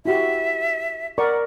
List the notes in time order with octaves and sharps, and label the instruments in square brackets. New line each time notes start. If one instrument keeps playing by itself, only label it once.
[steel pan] E4 F#4 G4 [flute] E5
[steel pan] A#4 D5 C#6 [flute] F#5